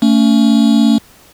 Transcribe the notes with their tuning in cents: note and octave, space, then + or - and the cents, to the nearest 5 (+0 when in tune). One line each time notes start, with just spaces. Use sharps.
A3 +30 C#4 +25